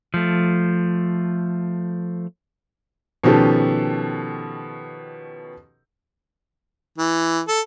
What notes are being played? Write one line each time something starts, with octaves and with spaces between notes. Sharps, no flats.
F3 A3
B2 D#3 F3 C#4 G4 A4
E3
A4